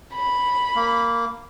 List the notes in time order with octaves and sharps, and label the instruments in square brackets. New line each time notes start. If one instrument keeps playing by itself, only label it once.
[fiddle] B5
[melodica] A#3